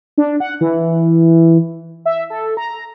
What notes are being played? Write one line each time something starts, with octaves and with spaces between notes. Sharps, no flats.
D4
F#5
E3
E5
A4
A#5